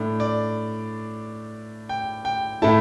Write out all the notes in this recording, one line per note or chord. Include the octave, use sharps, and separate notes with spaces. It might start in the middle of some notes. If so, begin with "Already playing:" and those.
Already playing: A2 A3 D4
D5
G5
G5
A2 A3 E4 A5